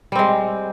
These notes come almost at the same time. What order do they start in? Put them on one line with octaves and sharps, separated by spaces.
G3 C4 G#3